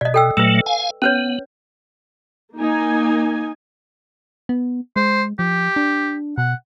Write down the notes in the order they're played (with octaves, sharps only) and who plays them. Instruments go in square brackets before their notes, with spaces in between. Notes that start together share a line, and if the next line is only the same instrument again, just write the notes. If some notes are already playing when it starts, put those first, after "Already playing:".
[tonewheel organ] B2 [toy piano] D5 D#5
[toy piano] A4 G5 E6
[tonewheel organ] A#2 F#3 A3 [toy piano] B4 E6
[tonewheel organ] F5 G#5
[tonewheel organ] B3 [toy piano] C#4 B4 C#5
[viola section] A#3 D#4 G#5
[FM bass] B3
[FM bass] G#3 [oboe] C5
[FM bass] F3 [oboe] G4
[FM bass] D4
[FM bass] B2 [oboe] F#5